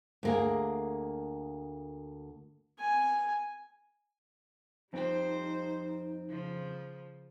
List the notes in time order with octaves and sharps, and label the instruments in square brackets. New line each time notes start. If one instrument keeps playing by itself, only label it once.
[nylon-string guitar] D2 A#3 G#4
[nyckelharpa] G#5
[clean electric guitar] F2 C4 [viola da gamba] G3 C5 [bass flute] D#4
[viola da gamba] C#3 F3